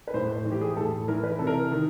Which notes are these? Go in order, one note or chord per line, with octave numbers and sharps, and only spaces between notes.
B4
A2 C5
E3
G4
G#4
A2 A4
E3 A#4
B4
A#4
C3 A4
A#4
D#3